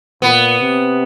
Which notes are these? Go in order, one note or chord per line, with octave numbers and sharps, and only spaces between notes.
A#2 B3
C3